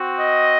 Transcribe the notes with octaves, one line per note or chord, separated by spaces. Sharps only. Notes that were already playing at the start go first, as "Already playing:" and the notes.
Already playing: C4 F#4
D#5